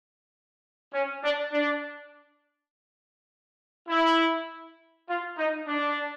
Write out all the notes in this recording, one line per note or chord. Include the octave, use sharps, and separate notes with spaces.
C#4
D4
D4
E4
F4
D#4
D4